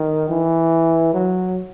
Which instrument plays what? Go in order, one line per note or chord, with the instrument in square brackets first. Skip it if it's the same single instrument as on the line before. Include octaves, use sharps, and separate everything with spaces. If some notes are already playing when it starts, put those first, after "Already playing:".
Already playing: [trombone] D#3
E3
F#3